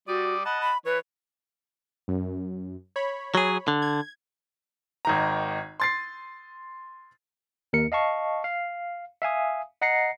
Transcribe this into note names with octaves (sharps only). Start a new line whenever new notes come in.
G3 F#4 D5 D#6
D#5 F#5 A5 B5
B5
E3 B4 C#5
F#2
C#5 B5
F#3 G#4
D3
G#6
G#1 D#3 A#5
C6 A6 C7
D#2 A#4 C#7
D#5 F5 A5 C#6
F5
E5 F5 G#5 D#6
D#5 F#5 A#5 A#6 C7 C#7